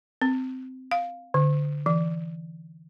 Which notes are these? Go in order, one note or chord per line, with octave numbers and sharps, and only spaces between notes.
C4
F5
D3
E3